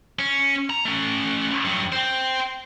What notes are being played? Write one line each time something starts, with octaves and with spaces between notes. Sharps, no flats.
C#4
A#5
A3 C#4
G2 F#3
C5 G5